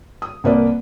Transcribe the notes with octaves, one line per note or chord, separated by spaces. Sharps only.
D#6
C2 A#3 B4 D5